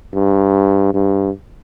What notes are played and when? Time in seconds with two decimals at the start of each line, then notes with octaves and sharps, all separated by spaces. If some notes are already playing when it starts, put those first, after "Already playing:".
0.14 G2
0.94 G2